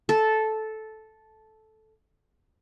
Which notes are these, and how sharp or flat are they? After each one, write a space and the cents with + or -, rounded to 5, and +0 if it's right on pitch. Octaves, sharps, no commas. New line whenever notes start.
A4 -10